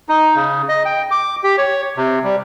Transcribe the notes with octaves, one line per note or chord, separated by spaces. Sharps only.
D#4
C#3
D#5
G5
D6
G4
C#5
C3
G3